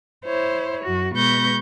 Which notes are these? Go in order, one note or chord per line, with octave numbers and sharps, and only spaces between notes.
E4 C5 C#5
F#2 F#4
B2 G#3 B4 C#6 G6 A#6